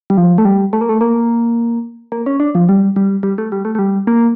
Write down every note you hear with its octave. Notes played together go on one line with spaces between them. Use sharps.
G3
F3
A3
G3
A3
A#3
A3
A#3
A#3
C#4
D4
F3
G3
G3
G3
A3
G3
A3
A3
G3
A#3